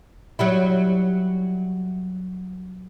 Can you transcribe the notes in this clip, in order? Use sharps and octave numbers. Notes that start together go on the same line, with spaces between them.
F#3 G3 E4